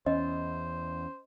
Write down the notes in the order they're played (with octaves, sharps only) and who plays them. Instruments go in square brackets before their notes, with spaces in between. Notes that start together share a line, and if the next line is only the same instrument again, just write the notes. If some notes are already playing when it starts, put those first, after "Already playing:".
[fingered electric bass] E2 [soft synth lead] C#4 [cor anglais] C5 [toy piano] D#5